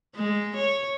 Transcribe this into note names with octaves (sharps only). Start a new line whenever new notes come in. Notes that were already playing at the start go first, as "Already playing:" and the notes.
G#3
C#5